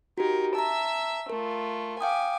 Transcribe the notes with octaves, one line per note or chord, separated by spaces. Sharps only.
D#4 F#4 G4 A#4
E5 A5 A#5 E6
A3 F4 A#4
F5 G5 G#5 D6 D#6